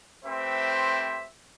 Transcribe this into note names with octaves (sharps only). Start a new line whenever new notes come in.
A3 C4 G4 B4 C5 E5